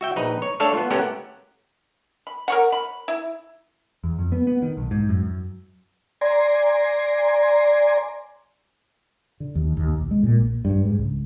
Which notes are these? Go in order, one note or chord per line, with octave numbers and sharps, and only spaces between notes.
F#4 E5 G5
A#1 D#4 B4 A#5
C#5
A3 D4 A4 C#5 D5 F5
B3 F4
A3 B3 C#4 G4 A#4 F#5
B5
A#4 C#5 F#5
B5
E4
E2
F2
B3
B3
D#3
B1
G#2
F#2
F#2
D5 G#5 A#5 C6
D3
D#2
D#2
B1
G#3
A#2
A#1
G2
G#2
C#2